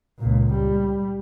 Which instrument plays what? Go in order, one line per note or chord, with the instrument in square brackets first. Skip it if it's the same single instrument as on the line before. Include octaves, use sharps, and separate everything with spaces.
[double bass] C#2 A#2
G3